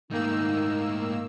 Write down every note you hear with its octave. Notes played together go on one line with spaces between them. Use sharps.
G#2 D#3 A3 A#3 D#4 E6